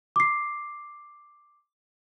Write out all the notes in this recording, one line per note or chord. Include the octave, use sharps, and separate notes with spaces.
D6 C7